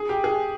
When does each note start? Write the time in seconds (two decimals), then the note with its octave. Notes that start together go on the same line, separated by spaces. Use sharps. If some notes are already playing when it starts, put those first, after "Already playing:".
Already playing: G#4
0.09 G4
0.24 G#4